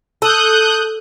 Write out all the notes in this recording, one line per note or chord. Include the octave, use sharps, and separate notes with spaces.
A4 D#6 F#6 G6